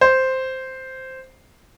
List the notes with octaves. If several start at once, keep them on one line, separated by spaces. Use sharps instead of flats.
C5